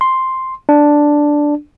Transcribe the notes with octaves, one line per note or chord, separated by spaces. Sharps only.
C6
D4